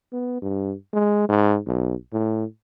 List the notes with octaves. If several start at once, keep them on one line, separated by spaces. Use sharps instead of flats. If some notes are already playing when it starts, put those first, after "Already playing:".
B3
G2
G#3
G#2
B1
A2